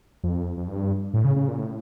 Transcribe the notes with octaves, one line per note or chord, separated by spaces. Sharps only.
F2
F2
G2
A2
C#3
C#3
A#2
A2